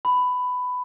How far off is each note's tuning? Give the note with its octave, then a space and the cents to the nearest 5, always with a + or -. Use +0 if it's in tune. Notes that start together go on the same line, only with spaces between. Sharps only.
B5 +15